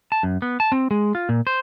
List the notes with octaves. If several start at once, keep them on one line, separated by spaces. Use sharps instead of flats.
A5
F#2
B3
A5
C4
G#3
F4
A#2
C5